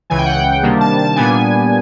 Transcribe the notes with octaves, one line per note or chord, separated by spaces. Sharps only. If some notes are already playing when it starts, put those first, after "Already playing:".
C#2 C#3 E3 G#5
G5
F#5
G5
C3 D#3 G3 A#3 D4
A5
A5
A#2 G3 B3 D4 G#5